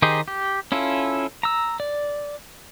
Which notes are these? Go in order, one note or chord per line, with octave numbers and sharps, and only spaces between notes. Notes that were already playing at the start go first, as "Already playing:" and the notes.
D#3 D#4 G4 G#4 C5
G4
C#4 E4 F4 A4
A#5 E6
D5